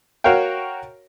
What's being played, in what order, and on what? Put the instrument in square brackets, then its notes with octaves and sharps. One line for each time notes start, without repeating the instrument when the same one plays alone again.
[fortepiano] F#4 A#4 C#5 F5 G5